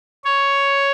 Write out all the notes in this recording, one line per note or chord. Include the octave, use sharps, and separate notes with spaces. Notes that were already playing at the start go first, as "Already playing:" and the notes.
C#5